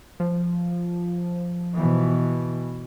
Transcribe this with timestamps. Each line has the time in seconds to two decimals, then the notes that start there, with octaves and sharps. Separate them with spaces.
0.20 F3
1.75 B2 E3